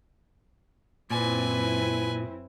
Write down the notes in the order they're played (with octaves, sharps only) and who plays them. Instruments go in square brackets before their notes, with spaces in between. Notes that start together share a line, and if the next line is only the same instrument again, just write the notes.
[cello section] F#2 C4 E4 [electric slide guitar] A#2 [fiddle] B4 G#5